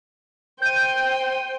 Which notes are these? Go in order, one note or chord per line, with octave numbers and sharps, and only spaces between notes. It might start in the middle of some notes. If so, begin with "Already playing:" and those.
C5 G5 G6 D#7